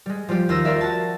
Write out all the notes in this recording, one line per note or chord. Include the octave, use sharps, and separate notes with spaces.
G3 G#3
F3 G3 F4 G4
D#2 F4 E6 A#6
F4 A#4 D5 E5 F5
F#4 A5